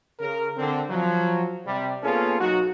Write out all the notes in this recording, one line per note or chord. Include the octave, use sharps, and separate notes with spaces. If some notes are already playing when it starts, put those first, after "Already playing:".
C#3 A#4
D3 C4
F3 F#3
C3 G3
A#3 B3 C#4 F4 G#4 A4
B1 F#3 D#4 F#4